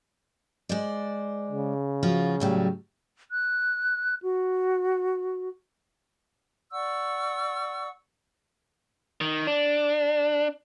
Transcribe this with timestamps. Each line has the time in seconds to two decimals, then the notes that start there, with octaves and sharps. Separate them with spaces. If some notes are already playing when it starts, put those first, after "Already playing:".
0.69 G#3 C5 D5
1.51 C#3
2.03 F3 F4 F#4
2.40 A2 F#3 G3
3.31 F#6
4.22 F#4
6.72 D5 F#5 C#6 E6
9.21 D#3
9.47 D4